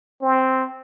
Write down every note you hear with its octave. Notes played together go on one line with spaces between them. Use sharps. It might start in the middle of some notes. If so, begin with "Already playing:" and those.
C4